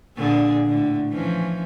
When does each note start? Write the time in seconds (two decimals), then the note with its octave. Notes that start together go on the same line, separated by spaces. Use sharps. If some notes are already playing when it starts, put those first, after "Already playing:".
0.17 A#2 D3 G#4
0.66 A2 D3
1.10 E3 F3 C#4